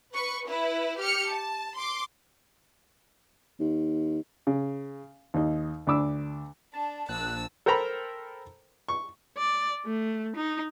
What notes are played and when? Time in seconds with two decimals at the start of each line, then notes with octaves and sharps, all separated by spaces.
0.13 B4 C#6
0.48 E4 B4
0.99 G4 F6 C#7
1.30 A5
1.76 C6 D6
3.59 D#2
4.47 C#3
5.34 D#2 D#4
5.87 D2 D4 B5 D6 E6
6.74 D4 A5
7.09 A#1 A5 E6 F#6
7.66 A4 A#4 C5 G5 A#5 B5
8.89 C#6
9.38 D5
9.86 A3
10.36 D#4